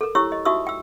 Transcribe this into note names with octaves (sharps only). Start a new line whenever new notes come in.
A4 A#4
E4 G4 C#5 C#6 E6
D#5
D#4 F#4 E5 C#6 D#6 E6
G5 E6